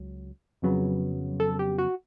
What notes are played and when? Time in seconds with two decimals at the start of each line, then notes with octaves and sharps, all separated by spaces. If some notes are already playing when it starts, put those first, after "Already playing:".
Already playing: C#2 F#3
0.62 F2 C#3 F#3 B3
1.40 A4
1.59 G4
1.78 F#4